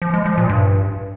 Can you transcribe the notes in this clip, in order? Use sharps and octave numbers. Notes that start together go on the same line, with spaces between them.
F3
G#3
F3
A#2
G2